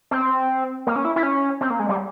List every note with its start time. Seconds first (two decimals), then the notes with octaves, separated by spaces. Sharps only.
0.11 C4
0.87 A#3
0.96 C#4
1.05 E4
1.16 E4
1.23 C#4
1.61 C4
1.70 A#3
1.80 G#3
1.89 G3